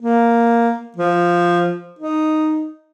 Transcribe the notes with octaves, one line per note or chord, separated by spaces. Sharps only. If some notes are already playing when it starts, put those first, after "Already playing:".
A#3
F3
D#4